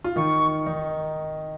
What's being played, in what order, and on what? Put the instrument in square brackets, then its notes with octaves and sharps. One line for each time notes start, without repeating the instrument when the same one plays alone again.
[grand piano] F4
[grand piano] D#3 D#4 [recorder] C#6
[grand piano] D#3 D#4